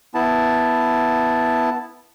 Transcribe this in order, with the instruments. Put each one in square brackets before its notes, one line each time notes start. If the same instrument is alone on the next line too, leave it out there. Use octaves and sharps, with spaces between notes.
[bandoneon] B3 E4 A5